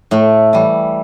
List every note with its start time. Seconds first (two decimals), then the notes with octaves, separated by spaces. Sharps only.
0.11 A2 A3
0.53 E3 G3